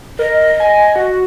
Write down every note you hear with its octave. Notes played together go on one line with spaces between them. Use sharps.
A#4 D#5
G#5
F#4